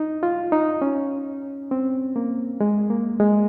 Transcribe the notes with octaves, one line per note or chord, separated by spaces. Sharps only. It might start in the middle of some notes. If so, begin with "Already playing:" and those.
Already playing: D#4
F4
D#4
C#4
C4
A#3
G#3
A#3
G#3